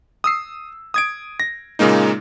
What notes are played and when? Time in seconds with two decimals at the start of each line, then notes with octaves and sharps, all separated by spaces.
0.24 D#6 E6 C7
0.94 D#6 G#6 D7
1.40 A#6
1.79 A#2 C#3 G#3 A#3 D#4